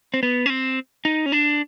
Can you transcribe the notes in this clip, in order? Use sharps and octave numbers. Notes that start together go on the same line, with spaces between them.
C4
B3
C#4
C4
D#4
C#4
D4